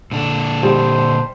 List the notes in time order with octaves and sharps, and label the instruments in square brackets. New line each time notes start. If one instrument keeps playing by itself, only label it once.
[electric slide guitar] A#2 D3 D4
[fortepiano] G3 [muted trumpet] C5